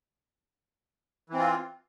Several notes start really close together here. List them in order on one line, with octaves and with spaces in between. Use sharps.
E3 C4 F4